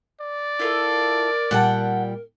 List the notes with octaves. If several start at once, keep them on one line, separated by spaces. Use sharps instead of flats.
D5
E4 F4 A4 A#4
A#2 G3 F#5 G5 A5